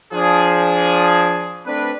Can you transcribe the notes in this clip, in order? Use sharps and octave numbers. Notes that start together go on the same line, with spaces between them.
F3 D4 G#4
A3 C4 D4 B4